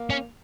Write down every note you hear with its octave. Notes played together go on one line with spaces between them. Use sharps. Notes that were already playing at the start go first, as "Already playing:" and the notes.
Already playing: A#3
C#4